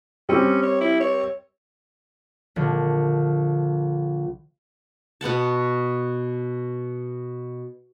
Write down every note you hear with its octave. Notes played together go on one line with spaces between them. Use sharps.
G3 C4 C#4
C#5
E4
C#5
A#1 D3
B2 B3 F#5 A5